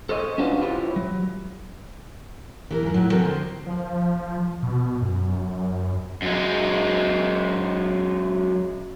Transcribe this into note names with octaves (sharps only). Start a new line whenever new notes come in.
A4 C5 C#5 D#5
C#4 D4 F4 F#4 B4 C5
E4 F4 G4 C5 C#5
F#3
E3 A4 A#4
G#2 F3
A2 F#3
G#3 C4 F#4 A4 A#4
D3 C5
F3
B2
F#2
F#2 G#3